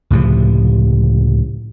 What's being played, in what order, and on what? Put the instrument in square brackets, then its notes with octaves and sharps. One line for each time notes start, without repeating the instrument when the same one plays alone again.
[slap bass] C#2 A2 C3 F3